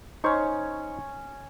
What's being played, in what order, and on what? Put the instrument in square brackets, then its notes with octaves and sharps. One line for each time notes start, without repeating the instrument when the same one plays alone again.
[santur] C#4 C#6 [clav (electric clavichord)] D#4 C5